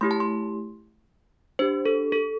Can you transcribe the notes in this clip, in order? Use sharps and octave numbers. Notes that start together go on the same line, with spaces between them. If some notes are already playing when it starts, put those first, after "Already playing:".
A3 E4 G4 C6
A5
C6
D4 G4 C5
A4
A4